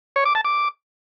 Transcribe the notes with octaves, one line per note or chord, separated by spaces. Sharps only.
C#5
D6
A5
D6